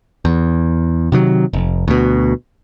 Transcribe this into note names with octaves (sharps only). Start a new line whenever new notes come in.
E2
C3 D#3 F#3
F1
D2 B2